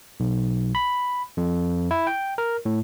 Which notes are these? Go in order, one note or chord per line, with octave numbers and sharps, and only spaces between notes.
B1
B5
F2
E4
G5
A#4
A2